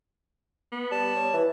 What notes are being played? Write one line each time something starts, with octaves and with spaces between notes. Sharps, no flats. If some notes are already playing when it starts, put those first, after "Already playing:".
B3
G3 A5
C#5
E3